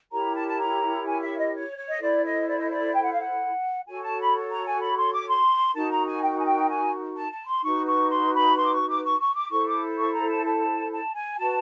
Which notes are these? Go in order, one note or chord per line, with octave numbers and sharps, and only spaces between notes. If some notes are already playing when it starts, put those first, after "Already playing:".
E4 G4 A#4 C#5 A#5
A5
A5
A#5
G#5
E5
D#5
C#5
C#5
D#5
E4 A4 C5 D5
D#5
D5
D#5
D5
G5
F#5
F5
F#5
F#4 A4 C#5 G#5
A5
B5
A#5
G#5
B5
C6
D6
C6
D#4 F#4 A#4 A5
A#5
G#5
G5
G#5
G5
G#5
A5
A5
C6
D#4 F#4 B4 C#6
C#6
C6
B5
C6
D6
C#6
D6
C#6
C#6
D6
E4 A4 C5 C#6
D6
C#6
A#5
A5
A5
A5
G#5
F#4 B4 A5